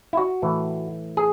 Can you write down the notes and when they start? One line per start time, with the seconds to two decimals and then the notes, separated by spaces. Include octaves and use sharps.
0.13 E4
0.17 F#4
0.42 A2 E3
1.17 G#4